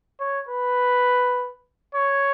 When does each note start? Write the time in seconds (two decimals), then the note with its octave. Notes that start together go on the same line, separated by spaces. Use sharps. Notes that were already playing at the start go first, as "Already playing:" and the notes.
0.20 C#5
0.49 B4
1.94 C#5